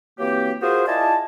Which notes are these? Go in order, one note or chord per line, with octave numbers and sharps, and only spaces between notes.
E3 F#3 A#3 C4 G4
F4 F#4 G#4 A#4 C5
E4 F4 D5 D#5 G#5 A5